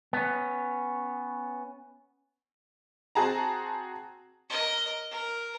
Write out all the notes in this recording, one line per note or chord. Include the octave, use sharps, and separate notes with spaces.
B3 C#4
C4 F#4 G#4 A5 A#5
A#4 D#5
A#4